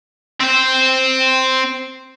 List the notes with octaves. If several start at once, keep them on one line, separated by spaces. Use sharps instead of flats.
C4 C5